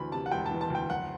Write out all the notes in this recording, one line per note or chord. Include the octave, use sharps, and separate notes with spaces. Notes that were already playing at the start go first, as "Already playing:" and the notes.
Already playing: D2 E3 B5
C3 A5
F#5
E1 G5
A5
E3
A5
D2 G5
F#1 F#5